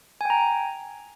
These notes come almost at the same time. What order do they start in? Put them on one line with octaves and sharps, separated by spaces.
G#5 G5 A#5